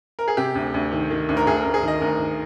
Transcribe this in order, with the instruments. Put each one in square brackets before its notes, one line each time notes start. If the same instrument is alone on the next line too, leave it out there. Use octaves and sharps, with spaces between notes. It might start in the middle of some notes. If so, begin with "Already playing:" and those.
[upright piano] A#4
G#4
C3 G4
D2
D2
D#3
D#3
D2
A#4
D2 G#4
D2 A#4
G#4
D#3 D#5
D2 A#4
D#3